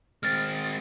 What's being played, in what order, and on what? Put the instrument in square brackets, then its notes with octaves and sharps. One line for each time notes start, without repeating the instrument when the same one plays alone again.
[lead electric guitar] G#3 C4 [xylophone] F6 A6